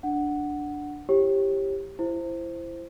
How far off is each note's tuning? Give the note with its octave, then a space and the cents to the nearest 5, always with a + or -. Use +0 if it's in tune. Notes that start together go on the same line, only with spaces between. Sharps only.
D4 +0 F#5 +0
E4 +25 G4 +0 C#5 -35
E4 +25 C5 +0